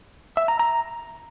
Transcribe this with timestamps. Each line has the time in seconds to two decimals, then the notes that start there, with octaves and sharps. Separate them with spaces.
0.37 E5
0.48 A#5
0.59 A#5